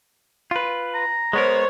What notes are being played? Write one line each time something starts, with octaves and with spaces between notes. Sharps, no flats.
F4 B4
A#5
G#3 B3 A#4 C5 C#5